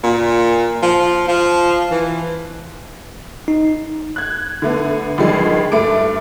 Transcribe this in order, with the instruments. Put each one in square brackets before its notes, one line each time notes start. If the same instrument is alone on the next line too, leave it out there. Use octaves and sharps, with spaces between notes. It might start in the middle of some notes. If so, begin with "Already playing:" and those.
[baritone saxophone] A#2
F3
F3
E3
[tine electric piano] D#4
[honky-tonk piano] F#6 G#6
D3 A3 B3
C#2 D3 D#3 F3 G3 G#3
G2 A3 A4 D6 D7